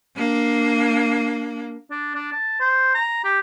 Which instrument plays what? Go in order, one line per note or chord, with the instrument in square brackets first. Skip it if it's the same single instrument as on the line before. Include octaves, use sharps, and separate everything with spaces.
[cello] A#3 D4
[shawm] D4
D4
A5
C5
A#5
G4